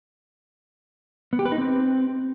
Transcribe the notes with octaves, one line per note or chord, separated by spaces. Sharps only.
B3
G4
B4
D#4
C4